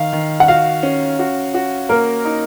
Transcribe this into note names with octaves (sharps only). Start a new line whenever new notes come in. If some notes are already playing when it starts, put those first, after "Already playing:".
Already playing: D#3 F5
D#3
F#5
F#4 F5
C#4
F#4
F#4
A#3 A#4
D#4